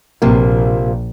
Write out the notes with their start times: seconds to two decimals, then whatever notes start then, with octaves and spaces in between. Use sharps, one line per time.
0.22 A#1 C3 F3 A#3